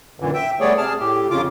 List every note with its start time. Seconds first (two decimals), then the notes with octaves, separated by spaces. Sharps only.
0.20 F#2 A#2 D3 E3
0.34 E5 G5
0.60 G3 A3 B3 G#4 C#5 D5
0.77 C3 G#4 A5 F6
0.99 A2 G4
1.30 F2 C#3 F4 D6